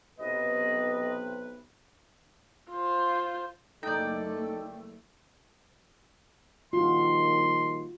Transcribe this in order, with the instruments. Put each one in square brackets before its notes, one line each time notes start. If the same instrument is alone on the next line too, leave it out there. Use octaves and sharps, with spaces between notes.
[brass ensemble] B1 C3 B4 [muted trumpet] D#5
[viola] F4 C5
[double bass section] F#1 A3 [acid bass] D#4 [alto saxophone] A4 [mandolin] D5 G5
[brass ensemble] A#1 G2 D#3 [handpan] F4 F#4 [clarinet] C6